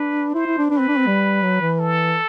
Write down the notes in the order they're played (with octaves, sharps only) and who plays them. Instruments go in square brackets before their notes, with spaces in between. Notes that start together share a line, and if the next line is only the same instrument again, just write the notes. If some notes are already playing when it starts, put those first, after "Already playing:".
Already playing: [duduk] D4 [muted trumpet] B4
[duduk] E4 [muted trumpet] C5
[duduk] E4
D4
[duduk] D4 [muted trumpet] B4
[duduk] C4
D4
C4
G3
F#3
E3
[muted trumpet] A4